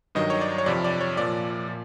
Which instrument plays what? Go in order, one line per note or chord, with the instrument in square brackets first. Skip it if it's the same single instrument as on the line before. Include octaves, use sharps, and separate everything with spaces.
[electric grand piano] G2 D#3 F#3 D#5
C#5
D5
C#5
F2 C3 F3 D5
D5
C#5
A#2 F3 D5
A#2